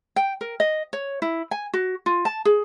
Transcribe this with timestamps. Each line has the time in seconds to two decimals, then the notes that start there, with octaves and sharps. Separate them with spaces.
0.16 G5
0.41 A#4
0.60 D#5
0.93 C#5
1.22 E4
1.51 G#5
1.73 F#4
2.06 F4
2.25 A5
2.45 G#4